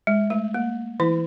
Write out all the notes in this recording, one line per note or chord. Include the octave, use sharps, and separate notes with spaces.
G#3
A3
A#3
E3 E4